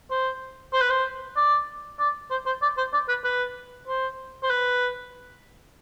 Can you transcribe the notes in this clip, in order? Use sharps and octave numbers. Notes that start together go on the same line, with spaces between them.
C5
C5
B4
C5
D5
D5
C5
C5
D5
C5
D5
B4
B4
C5
C5
B4